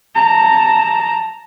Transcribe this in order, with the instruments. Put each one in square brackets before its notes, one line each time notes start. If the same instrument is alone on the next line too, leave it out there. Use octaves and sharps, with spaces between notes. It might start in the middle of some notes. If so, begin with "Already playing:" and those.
[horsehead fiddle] A5 A#5